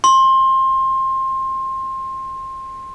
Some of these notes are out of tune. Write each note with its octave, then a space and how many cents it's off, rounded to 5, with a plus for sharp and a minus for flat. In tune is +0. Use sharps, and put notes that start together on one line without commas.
C6 +25